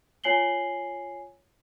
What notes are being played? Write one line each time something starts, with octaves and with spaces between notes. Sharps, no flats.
F4 C#5 G#5 C7 F#7 G7